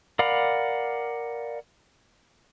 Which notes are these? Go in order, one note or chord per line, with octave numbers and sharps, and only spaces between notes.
A#4 D5 F5 F#5 B5